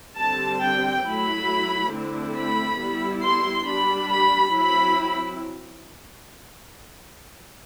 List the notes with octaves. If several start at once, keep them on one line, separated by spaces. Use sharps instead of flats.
D3 G3 C4 A5
G5
F#3 A3 E4 B5
D3 A3 C4 E4
B5
G3 B3 E4
C6
G3 D4 B5
B5
F#3 C4 E4 B5